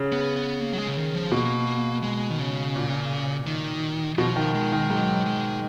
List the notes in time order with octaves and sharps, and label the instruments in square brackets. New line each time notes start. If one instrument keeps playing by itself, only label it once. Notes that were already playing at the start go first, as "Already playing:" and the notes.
Already playing: [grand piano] C#3
[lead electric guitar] B3
B3
A#3
F#3
G#3
C#3
D#3
F3
[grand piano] B2 [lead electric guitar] A#3
[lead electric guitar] G#3
D#3
C#3
[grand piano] A#2
[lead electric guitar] D#3
[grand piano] B2 [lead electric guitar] F3
[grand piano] D#3
[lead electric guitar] G#3
[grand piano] D#3
[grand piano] G#2 [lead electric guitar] F#3
[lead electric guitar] G#3